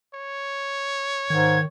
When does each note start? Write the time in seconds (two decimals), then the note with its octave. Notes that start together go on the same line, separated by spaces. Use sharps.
0.15 C#5
1.30 G#2 D#3 G#6